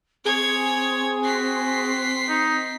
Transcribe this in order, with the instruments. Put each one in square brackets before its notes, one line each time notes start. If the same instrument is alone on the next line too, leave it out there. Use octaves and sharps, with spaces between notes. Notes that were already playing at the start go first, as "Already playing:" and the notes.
[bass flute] C4 [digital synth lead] G#4 [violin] C#5 G#6
[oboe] F#4 [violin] B6 C7
[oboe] D#4